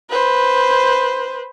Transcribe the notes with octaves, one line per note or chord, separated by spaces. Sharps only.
B4 C5